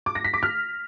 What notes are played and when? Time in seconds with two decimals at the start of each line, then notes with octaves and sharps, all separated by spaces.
0.06 D6
0.15 A#6
0.24 B6
0.34 D6
0.43 F6